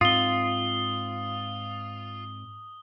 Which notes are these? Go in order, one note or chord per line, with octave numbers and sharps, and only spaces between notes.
G#2 C4 F4 D#6 G7